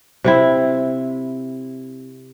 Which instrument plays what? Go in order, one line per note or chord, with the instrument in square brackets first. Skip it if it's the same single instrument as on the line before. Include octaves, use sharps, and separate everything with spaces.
[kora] C3 C4 E4